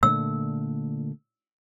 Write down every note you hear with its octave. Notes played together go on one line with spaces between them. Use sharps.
A#2 D3 A3 E6